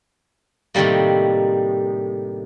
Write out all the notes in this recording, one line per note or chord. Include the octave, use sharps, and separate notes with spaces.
A2 C3 D#3 G3 A#3